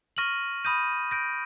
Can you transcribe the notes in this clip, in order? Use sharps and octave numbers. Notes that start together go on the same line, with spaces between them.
C#6 F6 A#6 D#7 F#7
B5 D#6 G6 A#6 D#7
G6 A#6 D7